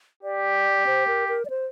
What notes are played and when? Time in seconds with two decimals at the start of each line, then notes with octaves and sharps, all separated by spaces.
0.23 G4 D5
0.86 C5
1.07 A#4
1.29 A#4
1.45 D5
1.50 C5